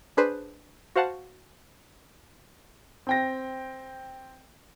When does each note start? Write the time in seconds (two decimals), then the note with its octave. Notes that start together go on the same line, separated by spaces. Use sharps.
0.17 D4 G#4 B4 C5
0.96 F#4 C5 F5 F#5 A5
3.07 C4 G5 A#6